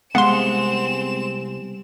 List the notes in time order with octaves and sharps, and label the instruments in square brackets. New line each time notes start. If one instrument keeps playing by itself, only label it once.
[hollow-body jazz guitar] C2 B3 F5 [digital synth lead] G#3 [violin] C4 E7 [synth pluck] F#5 C6